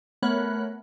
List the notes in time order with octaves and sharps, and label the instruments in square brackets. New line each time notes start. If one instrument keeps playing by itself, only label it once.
[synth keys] A3 B3 A#4 C#5 B5 F#6